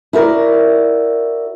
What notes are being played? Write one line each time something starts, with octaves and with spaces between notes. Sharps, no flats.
E4 F#4 A#4 D5